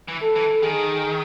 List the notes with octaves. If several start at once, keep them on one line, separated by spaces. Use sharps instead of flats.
E3
A4
E3
D#3 G#4